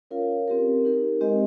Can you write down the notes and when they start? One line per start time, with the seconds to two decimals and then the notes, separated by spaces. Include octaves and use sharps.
0.11 C#4 F4 A#4 C#5 F5
0.48 C4 G4 A#4
0.85 D#4 G4 A#4
1.21 G#3 C4 G4 C5 D#5